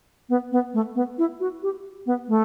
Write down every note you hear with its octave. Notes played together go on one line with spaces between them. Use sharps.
B3
B3
A3
B3
E4
F#4
G4
B3
A3